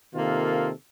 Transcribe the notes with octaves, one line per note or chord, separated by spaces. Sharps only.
C3 D#3 A#3 F4 A4